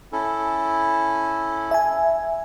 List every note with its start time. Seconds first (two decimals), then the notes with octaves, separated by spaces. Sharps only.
0.12 C#4 E4 A4
1.71 E5 G#5